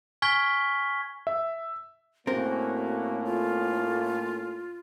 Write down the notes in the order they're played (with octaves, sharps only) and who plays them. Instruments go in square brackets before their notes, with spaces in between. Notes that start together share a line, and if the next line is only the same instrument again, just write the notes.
[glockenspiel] G#5 C#6 F6 G#6 B6 G7
[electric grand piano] E5
[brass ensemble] A2 A#3 C#4 [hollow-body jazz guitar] C4 A#4 [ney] F#4
[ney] F4